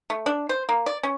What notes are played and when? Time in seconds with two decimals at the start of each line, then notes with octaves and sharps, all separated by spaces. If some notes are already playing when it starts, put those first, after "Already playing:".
0.10 A3
0.26 D4
0.49 C5
0.69 A#3
0.86 D5
1.03 C#4